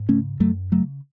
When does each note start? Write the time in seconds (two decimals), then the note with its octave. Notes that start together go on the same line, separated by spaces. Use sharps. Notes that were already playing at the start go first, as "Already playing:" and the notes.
Already playing: G#2
0.09 C#3 A3 C#4
0.40 F#2 F#3 A3
0.72 C#3 F#3 A3